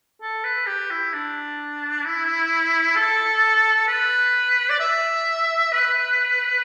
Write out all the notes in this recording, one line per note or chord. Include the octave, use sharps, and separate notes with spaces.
A4
B4
G4
E4
D4
E4
A4
B4
D5
E5
B4